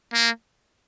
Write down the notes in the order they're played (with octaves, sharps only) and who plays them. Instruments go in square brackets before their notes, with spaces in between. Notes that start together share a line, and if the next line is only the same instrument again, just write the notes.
[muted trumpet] A#3